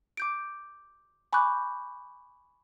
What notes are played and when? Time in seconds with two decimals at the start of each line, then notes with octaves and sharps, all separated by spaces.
0.17 D6 G6 D7
1.33 G#5 B5 C#6 D6 F#6 G6